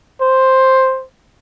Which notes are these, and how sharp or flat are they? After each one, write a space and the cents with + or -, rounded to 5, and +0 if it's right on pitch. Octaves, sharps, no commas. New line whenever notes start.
C5 +5